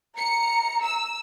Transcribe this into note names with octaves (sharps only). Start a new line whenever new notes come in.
A#5 C#7
E6